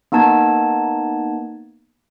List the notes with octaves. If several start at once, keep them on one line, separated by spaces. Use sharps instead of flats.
A#3 B3 D#4 A5 G#6 A6